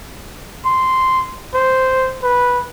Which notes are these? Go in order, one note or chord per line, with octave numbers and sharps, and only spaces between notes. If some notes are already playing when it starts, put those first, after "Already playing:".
C6
C5
B4